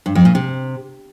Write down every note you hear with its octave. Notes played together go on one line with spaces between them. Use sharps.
G2
F2
A#2
C3